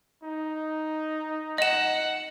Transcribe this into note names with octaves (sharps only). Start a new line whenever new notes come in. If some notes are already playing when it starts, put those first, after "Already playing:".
D#4
D#5 F#5 E7